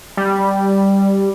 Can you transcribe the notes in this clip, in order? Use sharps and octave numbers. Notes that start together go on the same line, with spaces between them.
G3